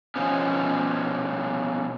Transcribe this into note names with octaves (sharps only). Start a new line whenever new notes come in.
B2 F3 B3 C#4